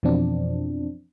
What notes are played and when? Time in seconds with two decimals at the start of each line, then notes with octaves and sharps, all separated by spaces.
0.03 F2 B2 E3 F3 C4 D4